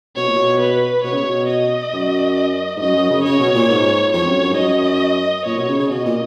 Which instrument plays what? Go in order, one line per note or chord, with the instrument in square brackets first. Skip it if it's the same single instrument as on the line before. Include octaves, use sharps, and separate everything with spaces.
[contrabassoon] B2 [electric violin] C#5
[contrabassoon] A#2
B2
[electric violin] B4
[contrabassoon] B2 [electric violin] C#5
[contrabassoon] C#3
B2
[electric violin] D#5
[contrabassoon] F#2
G#2
[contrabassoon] F#2 [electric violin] D#5
[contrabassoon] F#2
C#3
[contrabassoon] C#3 [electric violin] C#5
[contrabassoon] B2
A#2
G#2
[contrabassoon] F2 [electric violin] C#5
[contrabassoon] F#2
F#2
G#2
[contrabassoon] F#2 [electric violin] D#5
[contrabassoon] A#2 [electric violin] C#5
[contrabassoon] B2
C#3
C#3
[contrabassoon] B2 [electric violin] D#5
[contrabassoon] A#2